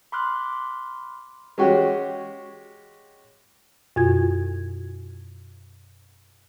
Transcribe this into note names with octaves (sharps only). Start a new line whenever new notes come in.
B5 C6 D6 F6 F#6
G#3 C#4 F#4 G4
F#2 B2 F4 F#4 G#6